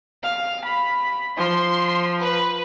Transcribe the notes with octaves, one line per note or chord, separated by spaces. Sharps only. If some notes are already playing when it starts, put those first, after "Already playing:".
F5
B5
F3 C6
B4